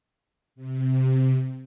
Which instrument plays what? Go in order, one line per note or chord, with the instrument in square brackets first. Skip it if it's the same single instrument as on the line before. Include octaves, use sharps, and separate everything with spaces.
[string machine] C3